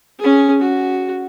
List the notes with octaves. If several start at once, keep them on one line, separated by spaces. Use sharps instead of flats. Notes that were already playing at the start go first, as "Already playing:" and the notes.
C#4 G#4
F#4